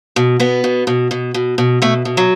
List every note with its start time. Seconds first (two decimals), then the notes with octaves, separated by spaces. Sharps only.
0.16 B2
0.40 B2 B3
0.64 B2
0.87 B2
1.11 B2
1.34 B2
1.58 B2
1.82 B2 A3
2.05 B2
2.17 F#3